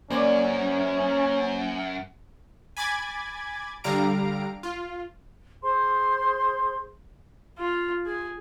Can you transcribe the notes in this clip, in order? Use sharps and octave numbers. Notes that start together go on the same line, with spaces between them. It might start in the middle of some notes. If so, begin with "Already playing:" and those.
F#2 A#3 C#4 C5 D5 G#5
G#5 B5 D6 G#6 A6
D3 G3 F5 A#5 D7
F4
G#4 C5 C6
F4
G#4